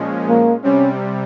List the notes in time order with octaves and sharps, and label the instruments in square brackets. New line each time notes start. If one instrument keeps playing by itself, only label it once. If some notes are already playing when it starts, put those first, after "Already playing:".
Already playing: [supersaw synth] A#2 F3 G#3 C#4
[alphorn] A#3
[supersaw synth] C3 G3 [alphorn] C#4